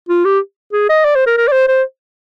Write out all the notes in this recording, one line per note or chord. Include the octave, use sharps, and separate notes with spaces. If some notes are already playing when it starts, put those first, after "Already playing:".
F4
G4
G#4
D#5
D5
C5
A#4
A#4
D5
C5
C5